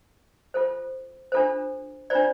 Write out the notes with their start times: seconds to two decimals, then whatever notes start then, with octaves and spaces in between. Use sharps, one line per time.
0.54 F4 A4 C5
1.32 D4 F4 A4 C5
2.10 D4 F4 C5 D5